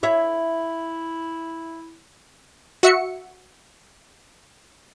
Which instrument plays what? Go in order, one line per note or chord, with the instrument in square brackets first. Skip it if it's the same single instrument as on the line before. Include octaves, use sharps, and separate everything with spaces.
[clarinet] E4 [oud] C#5 E5
[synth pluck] F#4 E5 C#7